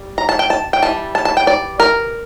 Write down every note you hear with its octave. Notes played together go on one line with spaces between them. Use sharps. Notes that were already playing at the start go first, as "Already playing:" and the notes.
Already playing: G3
A#5
A5
G5
A5
G5
E3 G3 A5
A5
A5
G5
D5
A#4